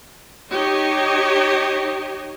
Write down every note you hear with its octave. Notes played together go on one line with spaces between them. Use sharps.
D#4 G4 C#5 D#5